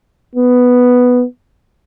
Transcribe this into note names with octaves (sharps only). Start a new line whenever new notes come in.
B3